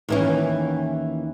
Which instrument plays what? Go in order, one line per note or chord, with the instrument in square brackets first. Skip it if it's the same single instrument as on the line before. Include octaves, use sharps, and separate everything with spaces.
[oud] D#2 E3 C#4